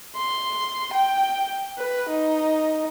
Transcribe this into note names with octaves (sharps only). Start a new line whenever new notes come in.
C6
G5
B4
D#4